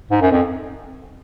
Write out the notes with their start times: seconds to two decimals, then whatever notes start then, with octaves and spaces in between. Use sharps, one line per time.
0.11 G#2
0.21 F#2
0.32 F2